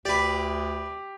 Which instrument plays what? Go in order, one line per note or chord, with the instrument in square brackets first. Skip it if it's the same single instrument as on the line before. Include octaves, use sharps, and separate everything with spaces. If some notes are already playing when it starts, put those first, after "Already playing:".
[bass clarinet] D2 [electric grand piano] G4 [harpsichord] B4 D5